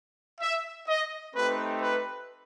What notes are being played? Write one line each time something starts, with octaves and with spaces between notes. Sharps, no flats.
E5
D#5
A3 C4 D#4 G4 B4
B4